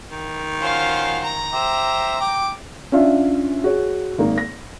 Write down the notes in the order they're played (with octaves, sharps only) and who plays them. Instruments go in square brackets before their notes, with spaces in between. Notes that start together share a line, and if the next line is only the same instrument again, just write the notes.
[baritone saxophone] D#3
[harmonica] C#4 F4 F#4 [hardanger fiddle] C5 F5
[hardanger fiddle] A#5
[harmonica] G4 C5 E5
G5 D6
[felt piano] C#4 D4 F4 E5
F#4 G#4 C#5
G#1 A#3 D#4
A#6